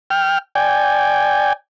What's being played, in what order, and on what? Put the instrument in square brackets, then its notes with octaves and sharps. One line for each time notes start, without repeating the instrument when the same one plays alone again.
[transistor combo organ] G5 F6
D5 G5 G#5